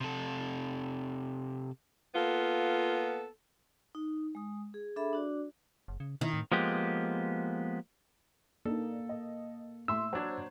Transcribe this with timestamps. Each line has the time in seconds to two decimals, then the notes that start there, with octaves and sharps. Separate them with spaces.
0.01 C3 A4
2.15 A#3 B3 F4 A4
3.95 D#4
4.35 G#3 D#6
4.74 G#4
4.96 D4 G#4 A4 E5 B5
5.13 D4 F#4 D5
5.88 F#1
6.00 C#3
6.21 D#3 E4
6.34 A2
6.52 F3 G#3 A#3 B3 G4
8.65 A#3 D4 D#4 A4
9.09 D#5
9.88 A2 E5 C6 E6
10.13 F#3 D4 C5 G#6